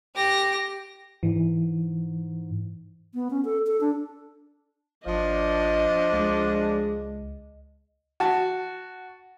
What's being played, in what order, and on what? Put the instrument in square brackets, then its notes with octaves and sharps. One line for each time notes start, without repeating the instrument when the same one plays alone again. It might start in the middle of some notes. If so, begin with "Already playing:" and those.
[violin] G4 A#6
[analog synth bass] G#2 [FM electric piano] E3
[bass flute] B3
C#4
A4
A4
D4
[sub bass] G#1 [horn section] F3 D4 [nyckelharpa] D#5
[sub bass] C#2 [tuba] G#3
[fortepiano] F#4 A5